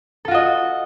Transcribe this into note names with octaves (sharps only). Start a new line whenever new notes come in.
F4 F#4 A4 D#5